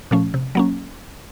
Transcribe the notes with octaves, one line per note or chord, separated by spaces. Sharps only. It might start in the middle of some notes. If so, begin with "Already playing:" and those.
A#2 F3 A3 C#4
C3
F#3 A#3 C#4